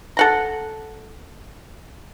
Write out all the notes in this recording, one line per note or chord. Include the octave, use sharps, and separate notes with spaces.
A4 F#5 A#5